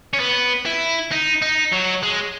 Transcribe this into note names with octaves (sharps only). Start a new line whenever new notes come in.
C#4
B3
E4
D#4
D#4
F#3
G#3